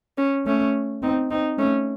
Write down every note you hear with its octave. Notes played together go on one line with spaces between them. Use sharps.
C#4
A3 C#4
C4 D#4
C4 D#4
A3 C#4